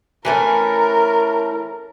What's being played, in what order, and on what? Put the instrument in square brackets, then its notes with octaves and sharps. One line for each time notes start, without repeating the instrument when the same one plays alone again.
[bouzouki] E3 A3 C#4 [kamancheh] A#4